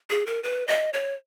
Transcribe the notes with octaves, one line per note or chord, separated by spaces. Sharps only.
G#4
A#4
B4
D#5
C#5